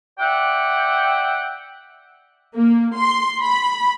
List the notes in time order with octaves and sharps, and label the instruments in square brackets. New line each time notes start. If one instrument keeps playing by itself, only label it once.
[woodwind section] D5 E5 F#5 G5
[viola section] A#3
C6
B5